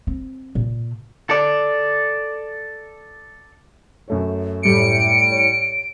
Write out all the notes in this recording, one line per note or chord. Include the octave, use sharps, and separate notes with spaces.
C4
A#2
A4 D5
F#2 A3 C#5
A2 G3 C#7 D7
C#5